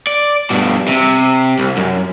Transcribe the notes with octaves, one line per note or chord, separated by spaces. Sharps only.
D5
G2 B2
C3
C2
F#2